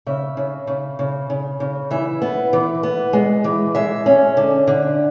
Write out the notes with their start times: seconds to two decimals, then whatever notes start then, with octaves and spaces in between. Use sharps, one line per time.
0.07 C#3 E5
0.37 C#3
0.67 C#3
0.99 C#3
1.30 C#3
1.60 C#3
1.91 E3 E5
2.22 B3
2.53 E3
2.83 B3
3.13 G#3
3.44 E3
3.75 G#3 E5
4.06 C#4
4.37 D3
4.67 D3